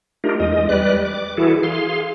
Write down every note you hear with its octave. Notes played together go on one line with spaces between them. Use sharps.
A3 D4 D#4 F4 G4 A#4
E2 G#3 D#5
G3 B4 D5 F#6
D6
E3 E4 F#4 G#4 A4
G#4 F5 C6